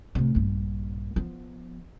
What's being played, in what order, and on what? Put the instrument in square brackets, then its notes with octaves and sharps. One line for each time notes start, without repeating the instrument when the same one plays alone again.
[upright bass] A2 C3
A#1 G2
F3 B3